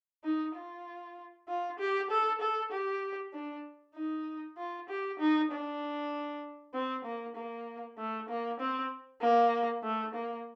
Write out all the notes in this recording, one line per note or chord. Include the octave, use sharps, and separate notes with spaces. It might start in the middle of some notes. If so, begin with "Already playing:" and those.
D#4
F4
F4
G4
A4
A4
G4
D4
D#4
F4
G4
D#4
D4
C4
A#3
A#3
A3
A#3
C4
A#3
A3
A#3